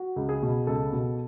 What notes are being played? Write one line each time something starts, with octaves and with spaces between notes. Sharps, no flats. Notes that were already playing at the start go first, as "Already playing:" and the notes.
Already playing: F#4
C#2
G#4
B2
C#2 A4
B2